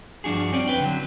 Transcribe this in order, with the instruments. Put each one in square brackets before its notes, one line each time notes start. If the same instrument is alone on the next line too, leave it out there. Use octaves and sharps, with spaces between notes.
[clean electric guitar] G2 F3 D4 F#4 G#4
C4 C#4 D5
F2 B4 G5
D3 F#3